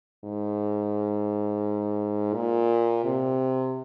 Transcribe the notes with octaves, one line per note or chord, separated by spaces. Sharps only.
G#2
A#2
C3